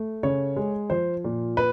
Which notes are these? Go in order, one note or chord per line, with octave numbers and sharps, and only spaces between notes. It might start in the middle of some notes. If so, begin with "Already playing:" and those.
Already playing: A3
C#3 C#5
G#3
F3 C5
A#2
B4